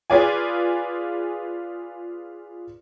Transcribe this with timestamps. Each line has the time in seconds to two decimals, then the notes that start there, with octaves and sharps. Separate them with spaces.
0.10 F4 G#4 B4 D5 F5 G#5